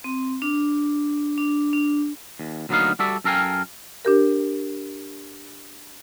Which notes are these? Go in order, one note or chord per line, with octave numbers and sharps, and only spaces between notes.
C4
D4
D4
D4
D#2
D2 F#3 A#3 B3 D#4 F5
G3 F#4 A4 D5 E5
F#2 A4 A#4 F5 G5 G#5
D4 G4 A#4